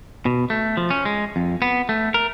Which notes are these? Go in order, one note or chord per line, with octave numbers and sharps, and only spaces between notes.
B2
A3
F3
C#4
G#3
F2
B3
A3
A#4